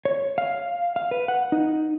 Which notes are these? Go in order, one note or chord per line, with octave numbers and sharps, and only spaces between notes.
C#5
F5
F5
B4
F#5
D#4